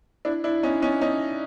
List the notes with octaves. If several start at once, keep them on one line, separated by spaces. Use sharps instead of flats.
D4 E4
D4 E4
C#4 D#4
C#4 D#4
C#4 D#4